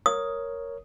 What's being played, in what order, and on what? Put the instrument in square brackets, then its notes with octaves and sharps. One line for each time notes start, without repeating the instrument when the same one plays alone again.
[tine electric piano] A#4 C#5 [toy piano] D#6